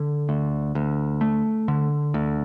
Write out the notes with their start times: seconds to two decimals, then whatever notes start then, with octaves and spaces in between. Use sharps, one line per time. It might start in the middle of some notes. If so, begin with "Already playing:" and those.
Already playing: D3
0.29 D2
0.75 D2
1.21 A3
1.68 D3
2.14 D2